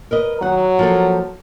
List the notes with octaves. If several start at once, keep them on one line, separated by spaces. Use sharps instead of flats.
A#4 B4 D#5
D#3 F#3 F#5
F3 A#3 A4